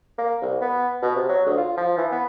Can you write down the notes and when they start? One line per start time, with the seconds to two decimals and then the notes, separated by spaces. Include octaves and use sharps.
0.18 A#3
0.42 C2
0.61 B3
1.02 B2
1.16 C3
1.29 F#3
1.46 D2
1.57 F4
1.77 F3
1.98 E3
2.12 B3